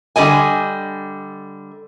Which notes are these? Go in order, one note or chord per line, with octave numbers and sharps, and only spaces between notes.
D3 G3 D#5 G#5